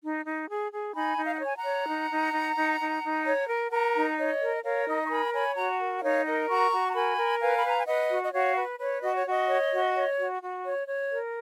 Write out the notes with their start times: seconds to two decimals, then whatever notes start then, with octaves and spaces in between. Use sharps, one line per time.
0.02 D#4
0.25 D#4
0.49 G#4
0.72 G#4
0.94 D#4 G#5 B5
1.17 D#4
1.25 F5
1.34 F#5
1.41 C#5 G#5
1.56 F#5 A#5
1.63 C#5
1.88 D#4
2.11 D#4
2.33 D#4
2.57 D#4
2.80 D#4
3.03 D#4
3.25 C#5
3.49 A#4
3.71 A#4 F#5 A#5
3.95 D#4
4.18 C#5 D#5
4.42 A#4
4.63 A#4 C#5 F5
4.87 D#4 D#5
5.06 C#6
5.10 A#4 G#5 B5
5.33 C#5 G#5 B5
5.56 F#4 F#5 A#5
5.80 A#4
5.98 F#5
6.02 D#4 C#5 F5
6.25 A#4 D#5 F#5
6.48 F#4 A#5 C#6
6.71 F#4
6.89 A#5
6.95 A#4 G#5 B5
7.18 A#4
7.41 B4 F5 G#5
7.57 B5
7.64 B4 A#5
7.78 G#5
7.87 B4 D#5 F#5
8.11 F#4
8.24 D#5
8.33 F#4 C#5 F5
8.56 B4
8.79 B4 C#5
9.02 F#4 D#5
9.16 C#5
9.26 F#4 D#5
9.49 C#5
9.72 F#4
9.95 C#5
10.19 F#4
10.42 F#4
10.65 C#5
10.87 C#5
11.11 A#4